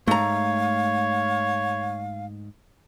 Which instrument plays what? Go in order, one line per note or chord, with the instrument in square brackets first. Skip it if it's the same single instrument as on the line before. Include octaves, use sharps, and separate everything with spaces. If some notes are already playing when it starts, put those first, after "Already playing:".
[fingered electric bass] G#2 [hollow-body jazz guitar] A3 A#5 [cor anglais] C#5 [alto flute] F5